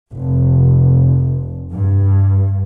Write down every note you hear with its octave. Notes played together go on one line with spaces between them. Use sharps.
F1
G2